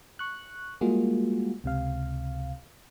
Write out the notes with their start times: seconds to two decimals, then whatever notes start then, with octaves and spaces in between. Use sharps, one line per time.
0.19 C#6 F#6
0.81 G3 G#3 A#3 F4 F#4 G#4
1.64 C#2 C3 F5